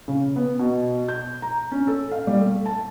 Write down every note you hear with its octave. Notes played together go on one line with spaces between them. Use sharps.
C#3
B3
B2
G6
A#5
C#4
A4
F5
G3
A3
A5